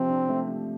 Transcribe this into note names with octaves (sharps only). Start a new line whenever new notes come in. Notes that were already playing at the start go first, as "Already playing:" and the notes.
Already playing: C3 F3 C4
D4
A3
C3